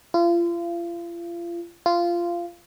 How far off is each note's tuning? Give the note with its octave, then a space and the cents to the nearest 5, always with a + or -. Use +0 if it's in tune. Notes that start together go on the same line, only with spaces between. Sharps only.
F4 -35
F4 -15